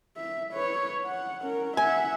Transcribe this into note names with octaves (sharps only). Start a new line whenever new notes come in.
E5
B4 C#5
F#5
C#4 A#4
E5 F#5 G#5